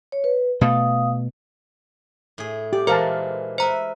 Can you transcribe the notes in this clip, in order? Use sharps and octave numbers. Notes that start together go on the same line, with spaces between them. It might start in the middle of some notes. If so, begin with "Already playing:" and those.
C#5
B4
B2 A3 F5 D#6
A2 G#4
G4 D5
A#2 E3 G#3 A#4 C5 F5 A5
B4 C5 E5 A#5